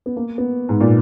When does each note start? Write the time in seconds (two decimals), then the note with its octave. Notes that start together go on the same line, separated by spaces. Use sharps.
0.06 B3
0.17 A#3
0.38 B3
0.69 G#2
0.81 A#2